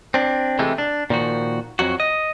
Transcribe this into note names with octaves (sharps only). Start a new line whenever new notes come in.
C4 D4
C3 E3 G#3 A3
D4
A#2 D#3 F3 F#4
F2 F#3 F#4
D#5